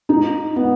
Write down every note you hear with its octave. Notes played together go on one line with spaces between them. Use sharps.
D#4
B3